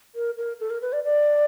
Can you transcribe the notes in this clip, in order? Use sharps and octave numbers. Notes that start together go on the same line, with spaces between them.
A#4
A#4
A4
A#4
B4
D5
D5